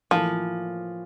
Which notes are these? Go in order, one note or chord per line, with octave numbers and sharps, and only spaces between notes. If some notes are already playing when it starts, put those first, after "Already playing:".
A2 E3 F3 A#3 F4